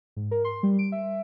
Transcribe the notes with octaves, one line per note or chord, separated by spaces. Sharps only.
G#2
A#4
C6
G3
D7
E5